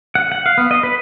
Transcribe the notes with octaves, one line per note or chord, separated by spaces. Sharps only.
F#5
F#5
F5
B3
D#5
B4